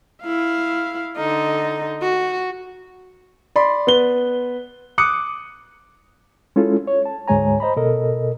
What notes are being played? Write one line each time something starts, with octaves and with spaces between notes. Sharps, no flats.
E4 F5
D3 D#4
F#4
D5 B5 C6
B3 B4 G7
D6 D#6 F#6 C#7
G#3 C#4 E4 F4 A4
C#5
A5
D2 G#2 G#3 C#5 G#5 A#5
C5 D#5 A#5 B5
B2 A4 A#4 D#5